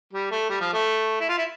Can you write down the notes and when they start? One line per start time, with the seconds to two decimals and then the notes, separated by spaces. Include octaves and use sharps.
0.13 G3
0.31 A3
0.49 G3
0.61 F3
0.73 A3
1.20 E4
1.29 F4
1.38 E4